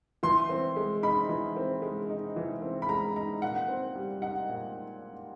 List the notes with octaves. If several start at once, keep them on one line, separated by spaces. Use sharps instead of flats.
E3 C6
C4
G#3
D#4 B5
E3
C4
G#3
D#4
E3
C4
B5
G#3 A#5
D#4 A#5
A#2 F#5
C4
G3
D#4 F#5
A#2